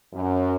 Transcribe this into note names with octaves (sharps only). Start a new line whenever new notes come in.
F#2